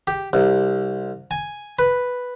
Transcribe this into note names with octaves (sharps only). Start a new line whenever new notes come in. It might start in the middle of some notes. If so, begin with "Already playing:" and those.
G4
C2
G#5
B4